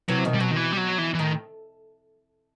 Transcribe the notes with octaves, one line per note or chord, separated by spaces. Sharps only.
C3 E3 F#3
B2 D#3
G3
B2 F#3
D#3
E3
G3
F#3
E3
E3
A2 D#3